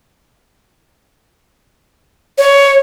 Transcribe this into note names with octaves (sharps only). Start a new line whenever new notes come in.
C#5